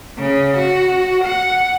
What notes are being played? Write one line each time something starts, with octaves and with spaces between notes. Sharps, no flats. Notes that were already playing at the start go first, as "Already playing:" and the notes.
C#3
F#4
F#5